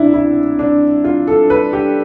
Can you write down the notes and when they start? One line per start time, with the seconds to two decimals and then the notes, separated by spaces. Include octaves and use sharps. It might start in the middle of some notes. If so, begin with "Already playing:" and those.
Already playing: C2 B2 D4 E4
0.14 E4
0.59 D4
1.04 F4
1.27 A4
1.50 B4
1.73 G4